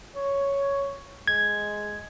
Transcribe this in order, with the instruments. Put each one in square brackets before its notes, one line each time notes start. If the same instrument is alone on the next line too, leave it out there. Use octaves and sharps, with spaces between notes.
[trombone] C#5
[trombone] G#3 [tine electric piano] G#6